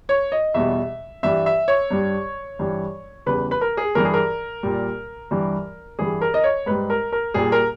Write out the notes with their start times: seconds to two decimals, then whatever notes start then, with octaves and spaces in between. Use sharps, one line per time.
0.09 C#5
0.32 D#5
0.54 E2 B2 G3 E5
1.23 G2 E3 G3 E5
1.46 E5
1.68 C#5
1.91 G2 G3
2.59 G2 E3 G3
3.26 E2 C#3 E3 G3 B4
3.51 B4
3.61 A#4
3.77 G#4
3.95 G2 E3 G3 A#4
4.05 G#4
4.14 A#4
4.63 A#2 G3
5.31 G2 E3 G3
5.99 G2 E3 G3 G#4
6.21 A#4
6.34 D#5
6.44 C#5
6.66 G#2 G3 B4
6.90 A#4
7.12 A#4
7.34 A#2 G3 G#4
7.52 A#4